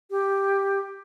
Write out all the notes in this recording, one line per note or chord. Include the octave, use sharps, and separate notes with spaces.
G4